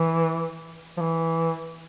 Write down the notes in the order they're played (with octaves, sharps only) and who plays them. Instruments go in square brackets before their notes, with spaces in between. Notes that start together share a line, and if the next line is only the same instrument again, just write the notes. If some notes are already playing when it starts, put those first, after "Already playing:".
Already playing: [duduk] E3
F3
E3